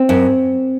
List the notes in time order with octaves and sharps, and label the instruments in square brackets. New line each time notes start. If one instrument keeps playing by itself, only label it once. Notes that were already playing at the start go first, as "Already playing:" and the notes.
Already playing: [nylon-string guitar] C4
F#2